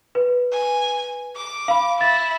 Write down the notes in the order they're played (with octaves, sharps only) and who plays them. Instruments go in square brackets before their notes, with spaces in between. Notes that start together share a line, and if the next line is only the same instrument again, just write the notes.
[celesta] B4
[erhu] G#5
D6
[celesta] F5 B5
[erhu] E4 [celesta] A6